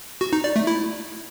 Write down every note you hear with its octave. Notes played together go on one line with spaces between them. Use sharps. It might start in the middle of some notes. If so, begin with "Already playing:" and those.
F#4
D#4
D5
A3
E4